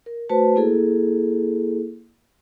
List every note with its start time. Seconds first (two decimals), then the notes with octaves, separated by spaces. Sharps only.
0.06 A#4
0.29 A3 F#4 B4 C5 A5
0.56 A#3 E4 G#4 A4